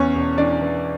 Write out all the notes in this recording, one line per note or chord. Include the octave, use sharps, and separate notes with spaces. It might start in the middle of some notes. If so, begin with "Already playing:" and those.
Already playing: E2 C#4 C#5
E1
E3 D4 D5
E3